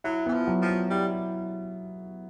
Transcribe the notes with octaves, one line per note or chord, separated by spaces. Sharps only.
F#3 E4
E3 B3
F3
F#3
F3
B3
G3 E4